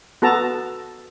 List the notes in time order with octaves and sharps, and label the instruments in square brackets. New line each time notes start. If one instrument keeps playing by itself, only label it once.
[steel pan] B3 F#4 A4 A5 A#5